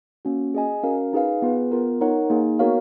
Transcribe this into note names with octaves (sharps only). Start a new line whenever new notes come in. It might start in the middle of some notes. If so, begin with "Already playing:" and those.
A#3 C#4 F#4
G#4 D#5 G#5
C#4 F#4 A#4 F5
D#4 G#4 B4 F5
B3 F4 G#4 B4
B3 F4 A#4
D#4 A#4 C#5 F#5
A#3 D#4 G#4
B3 F#4 A#4 C#5 F5